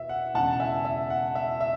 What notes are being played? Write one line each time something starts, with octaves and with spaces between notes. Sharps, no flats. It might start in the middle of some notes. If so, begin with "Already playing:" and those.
Already playing: E2 B2 E5
F#5
E1 E2 C#3 F#5 A5
E5 G#5
E5
F#5
E5
E5